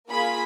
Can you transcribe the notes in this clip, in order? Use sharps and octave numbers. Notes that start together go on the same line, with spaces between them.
A#3 F4 G#4 B5